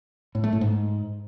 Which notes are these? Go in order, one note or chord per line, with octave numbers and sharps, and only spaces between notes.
A2
A3
A2
G#2